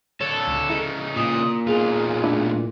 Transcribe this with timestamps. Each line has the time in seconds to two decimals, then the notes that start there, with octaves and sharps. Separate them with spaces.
0.21 D3 A4 C#5
0.47 C#2
0.70 C#3 D#4 E4
1.17 A#2 D#6
1.67 B1 F4 G#4
2.23 A3 D4 E4